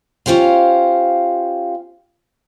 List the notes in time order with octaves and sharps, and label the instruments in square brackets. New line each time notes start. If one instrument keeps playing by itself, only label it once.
[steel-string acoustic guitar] C#4 F4 G4 C5 F5